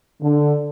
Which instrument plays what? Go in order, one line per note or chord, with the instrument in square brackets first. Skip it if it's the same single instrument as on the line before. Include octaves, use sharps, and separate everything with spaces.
[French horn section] D3